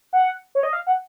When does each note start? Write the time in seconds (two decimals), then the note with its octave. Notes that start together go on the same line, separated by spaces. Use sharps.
0.13 F#5
0.55 C#5
0.63 D#5
0.73 F5
0.87 F#5